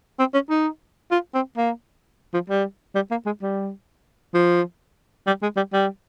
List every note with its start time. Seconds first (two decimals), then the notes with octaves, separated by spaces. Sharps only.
0.19 C4
0.34 C#4
0.50 D#4
1.11 F4
1.34 C4
1.57 A#3
2.34 F3
2.50 G3
2.95 G3
3.11 A#3
3.26 G#3
3.42 G3
4.34 F3
5.27 G3
5.42 G#3
5.57 G3
5.73 G3